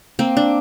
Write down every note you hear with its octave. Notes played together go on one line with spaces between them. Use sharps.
A#3 C4
D4